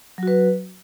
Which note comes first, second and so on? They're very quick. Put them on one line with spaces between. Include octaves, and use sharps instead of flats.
F#3 F#4 B4